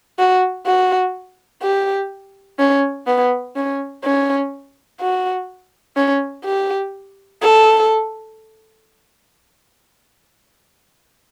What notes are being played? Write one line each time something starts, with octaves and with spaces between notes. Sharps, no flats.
F#4
F#4
G4
C#4
B3
C#4
C#4
F#4
C#4
G4
A4